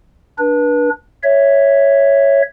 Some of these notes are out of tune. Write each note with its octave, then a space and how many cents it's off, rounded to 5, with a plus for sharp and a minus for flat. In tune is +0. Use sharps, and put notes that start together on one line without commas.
D4 +0 B4 -30
C#5 +0 E5 +0